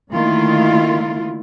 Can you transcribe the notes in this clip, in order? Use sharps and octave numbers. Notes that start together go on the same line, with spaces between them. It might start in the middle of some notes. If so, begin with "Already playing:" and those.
D3 D#3 A3 A#3 E4 F4